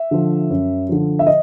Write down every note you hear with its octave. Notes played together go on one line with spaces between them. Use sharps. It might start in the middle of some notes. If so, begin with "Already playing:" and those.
Already playing: E5
D3 F3
F#2
D3 F3
E5
D#5